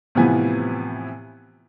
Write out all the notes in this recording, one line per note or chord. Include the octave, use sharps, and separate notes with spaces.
A2 C3 E3 F3 B3 G#5